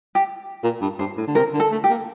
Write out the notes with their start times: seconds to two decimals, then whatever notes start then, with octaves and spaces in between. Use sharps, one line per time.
0.15 G4
0.63 A#2
0.81 G2
0.99 G2 C5
1.17 A2
1.27 D3
1.35 C3 A#4
1.54 D3
1.60 A4
1.72 A3
1.84 G4
1.90 A#3